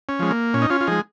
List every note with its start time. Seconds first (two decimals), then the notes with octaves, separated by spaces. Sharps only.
0.09 C#4
0.19 F3 G#3
0.31 A#3
0.54 A#2 C#4
0.62 D#4
0.70 C#4 F4
0.81 F4
0.87 F3 G#3 D#4 G#4